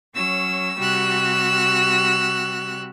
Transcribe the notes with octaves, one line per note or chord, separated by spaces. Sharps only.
F#3 C#4 E6
C3 G3 F#4 E6 F#6